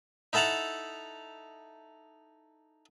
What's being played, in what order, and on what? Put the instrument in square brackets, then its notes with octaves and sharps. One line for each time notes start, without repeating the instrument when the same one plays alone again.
[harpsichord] D#4 E4 A4 F#5 A5 A#5